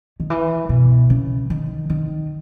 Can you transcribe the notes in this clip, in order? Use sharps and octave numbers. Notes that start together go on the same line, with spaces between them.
D#3
E3
B2
C#3
D#3
D#3